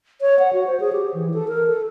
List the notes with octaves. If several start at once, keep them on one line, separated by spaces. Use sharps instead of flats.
C#5
F#5
F#4
C5
G#4
G4
E3
A4
A#4
A4